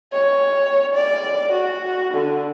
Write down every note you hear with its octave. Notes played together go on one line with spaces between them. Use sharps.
C#5
D5
F#4
D3